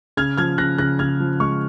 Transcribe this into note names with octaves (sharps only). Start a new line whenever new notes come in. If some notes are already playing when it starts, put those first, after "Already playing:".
C#3 F6 G#6
F3 F6 G#6
C#3 F#6 A#6
C#3 F#6 A#6
C#3 F6 G#6
F3
G#3 C#6 F6